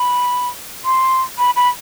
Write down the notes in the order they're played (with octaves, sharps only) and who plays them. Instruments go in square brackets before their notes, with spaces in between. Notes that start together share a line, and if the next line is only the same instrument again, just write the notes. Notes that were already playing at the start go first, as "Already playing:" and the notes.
Already playing: [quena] B5
C6
B5
B5